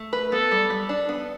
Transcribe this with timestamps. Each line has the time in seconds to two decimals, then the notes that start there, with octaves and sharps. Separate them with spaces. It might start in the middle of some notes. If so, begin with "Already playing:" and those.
Already playing: A3
0.13 B4
0.32 B3 A4
0.51 G3
0.70 G3
0.89 D4
1.09 B3